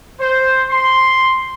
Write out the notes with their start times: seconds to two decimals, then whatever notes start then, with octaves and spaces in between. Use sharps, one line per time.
0.20 C5
0.69 C6